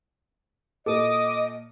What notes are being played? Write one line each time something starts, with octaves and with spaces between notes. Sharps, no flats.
A#2 A4 D#5 D6 D#6